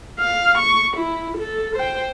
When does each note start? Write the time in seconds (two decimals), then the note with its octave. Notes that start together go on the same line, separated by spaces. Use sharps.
0.20 F5
0.58 C#6
0.96 E4
1.37 A4
1.76 C5 G5